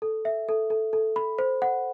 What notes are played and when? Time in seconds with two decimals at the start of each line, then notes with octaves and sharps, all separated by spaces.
0.02 A4
0.25 E5
0.49 A4
0.70 A4
0.93 A4
1.16 B5
1.39 C5
1.62 F#5